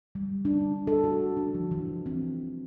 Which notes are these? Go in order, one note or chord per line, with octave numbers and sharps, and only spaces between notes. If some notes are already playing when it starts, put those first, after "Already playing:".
G3
D4
A4
F#4
D4
F3
E3
C4